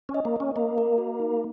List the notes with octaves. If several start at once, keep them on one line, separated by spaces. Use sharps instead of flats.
C#4
D#5
A#3
C#4 D#5
A#3 D#5
A#4
F#4
D#4